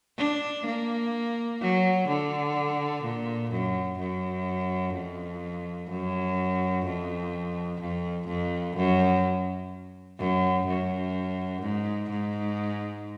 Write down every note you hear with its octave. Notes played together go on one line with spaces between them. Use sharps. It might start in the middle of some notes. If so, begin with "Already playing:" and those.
D4
A#3
F#3
D3
A#2
F#2
F#2
F2
F#2
F2
F2
F2
F#2
F#2
F#2
G#2
G#2